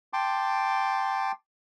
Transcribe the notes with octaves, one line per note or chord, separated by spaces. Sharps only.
G5 A5 C6 D6